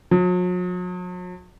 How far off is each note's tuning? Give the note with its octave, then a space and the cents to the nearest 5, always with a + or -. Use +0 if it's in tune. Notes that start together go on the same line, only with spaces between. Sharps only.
F#3 -45